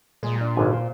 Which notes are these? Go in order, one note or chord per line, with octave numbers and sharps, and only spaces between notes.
A#2 G#3
D4
G#1 D3 G#5
C5